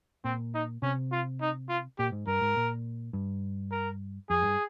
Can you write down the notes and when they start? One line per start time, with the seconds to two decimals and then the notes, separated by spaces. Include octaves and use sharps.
0.24 A#2 C4
0.54 D#4
0.82 C3 C#4
1.12 F4
1.41 D#4
1.69 F4
1.99 A#2 G4
2.12 G#2
2.27 G2 A#4
2.42 G#2
2.57 A#2
3.13 G2
3.72 A#4
4.30 F2 G#4
4.42 G2